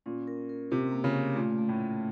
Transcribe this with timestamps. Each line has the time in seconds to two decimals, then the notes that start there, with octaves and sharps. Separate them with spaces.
0.06 A#2 C#4
0.27 A#4
0.49 A#4
0.71 C3 A#4
0.92 A#3
1.04 C#3
1.14 C#4
1.36 A#2 A3
1.58 A3
1.69 A2
1.80 A3